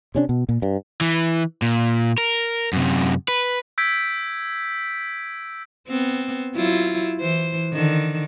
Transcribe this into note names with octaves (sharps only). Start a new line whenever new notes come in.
C3 C#4 D4
B2
A#2
G2
E3
A#2
A#4
F#2 C3
B4
E6 G6 G#6 B6 D7
B3 C4
F#3 E4 F4
E3 C5
D3 D#3